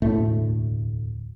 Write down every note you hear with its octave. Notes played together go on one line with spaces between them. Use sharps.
E1 D2 A2 A3